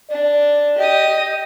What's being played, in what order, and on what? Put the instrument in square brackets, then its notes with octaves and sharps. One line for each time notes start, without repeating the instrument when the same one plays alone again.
[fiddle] D4 [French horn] D5
[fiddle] G4 D#6 [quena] D#5